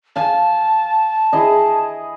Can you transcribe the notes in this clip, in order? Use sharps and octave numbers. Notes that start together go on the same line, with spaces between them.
F5 G#5 A5
E4 G#4 D#5